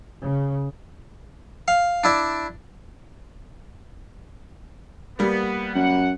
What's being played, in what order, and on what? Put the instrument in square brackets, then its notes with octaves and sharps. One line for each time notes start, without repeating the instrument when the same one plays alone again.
[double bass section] C#3
[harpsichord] F5
D4 E4 D5
[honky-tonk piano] G3 A#3 [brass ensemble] B3
[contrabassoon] F#2 [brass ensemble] F#5